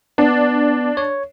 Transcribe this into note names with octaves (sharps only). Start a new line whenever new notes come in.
B3 D4
C#5